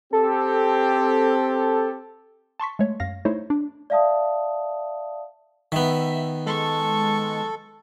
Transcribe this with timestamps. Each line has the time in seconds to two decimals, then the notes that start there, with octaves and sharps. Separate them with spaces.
0.13 C4 G4 A4
2.60 A5 C6 C#6 B6
2.79 G#3 A3 C#5
3.00 F#2 F5 A#6
3.25 A3 D#4 E4 C5 C#5
3.50 D4
3.90 D5 E5 F5 A5 D#6
5.72 D#3 B3 E5
6.46 G#3 A4 A5 C#6